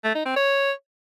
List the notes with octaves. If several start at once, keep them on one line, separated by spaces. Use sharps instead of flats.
A3
D#4
C4
C#5